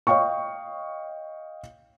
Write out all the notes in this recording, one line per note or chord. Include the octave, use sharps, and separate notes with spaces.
C#5 D#5 F5 G5 C#6